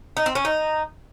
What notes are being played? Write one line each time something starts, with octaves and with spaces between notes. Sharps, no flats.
D#4
C4
C#4
D#4